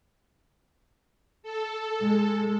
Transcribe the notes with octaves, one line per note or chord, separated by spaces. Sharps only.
A4
G#3